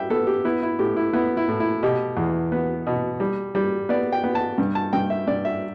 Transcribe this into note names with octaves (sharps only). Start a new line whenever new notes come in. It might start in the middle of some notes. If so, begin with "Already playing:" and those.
Already playing: G3 E5 G5
B3 A4
G4
B3 E4
E4
A2 G4
E4
B3 E4
E4
A2
E4
B2 G4
E2
B3
B2
G3
G3
B3 D5
G5
B3
A5
G2
A5
G2 G5
E5
G2 D5
E5